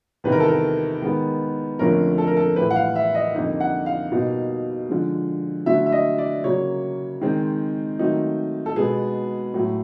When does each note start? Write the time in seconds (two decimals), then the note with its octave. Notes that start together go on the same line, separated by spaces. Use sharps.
0.24 E2 C3 D#3 G3 B4
0.32 A#4
0.40 A4
0.48 A#4
1.02 D#3 G#3 B3
1.79 F2 D3 F3 A3 C#4 A#4
2.18 A4
2.27 A#4
2.37 A4
2.56 A2 E3 G3 B4
2.71 F#5
2.76 F5
2.96 E5
3.15 D#5
3.34 F2 D3 G3 A#3 D#4
3.60 F#5
3.86 F5
4.11 B2 G3 A#3 D#4
4.89 D3 F3 G#3
5.66 D3 F#3 A3 E5
5.86 E5
5.92 D#5
6.18 D5
6.44 C#3 F#3 A#3 C#5
7.21 D#3 G#3 C4
7.99 D#3 F#3 A3 C4 D#4
8.66 A4
8.76 B2 G#3 B3 G#4
9.54 A2 F#3 A3